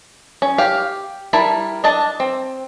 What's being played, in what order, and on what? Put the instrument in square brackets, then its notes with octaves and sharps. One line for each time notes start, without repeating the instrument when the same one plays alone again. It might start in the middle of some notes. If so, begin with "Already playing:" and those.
[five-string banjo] C#4
G4 F5
G3 E4 A#4 A5 B5
D4 D#5 A5
C4